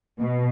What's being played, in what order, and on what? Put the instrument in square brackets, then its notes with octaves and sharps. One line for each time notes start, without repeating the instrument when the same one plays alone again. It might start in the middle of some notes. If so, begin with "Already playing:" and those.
[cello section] B2